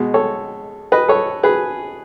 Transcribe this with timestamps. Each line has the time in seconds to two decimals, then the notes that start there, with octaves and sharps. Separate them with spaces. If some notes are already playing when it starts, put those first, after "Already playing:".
Already playing: B2 G#3
0.14 A4 C#5
0.92 B4 D#5
1.08 A4 C#5
1.43 G#4 B4